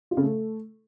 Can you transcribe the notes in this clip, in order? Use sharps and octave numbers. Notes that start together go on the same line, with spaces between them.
F4
C#3
A3